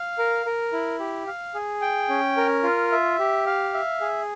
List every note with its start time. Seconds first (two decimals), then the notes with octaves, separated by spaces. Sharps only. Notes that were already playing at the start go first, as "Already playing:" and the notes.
Already playing: F5
0.19 A#4
0.46 A#4
0.73 E4
0.99 G4
1.27 F5
1.55 G#4
1.81 G5
2.09 C#4
2.37 A#4
2.63 F4
2.92 E5
3.19 G4
3.46 F5
3.74 E5
4.01 G#4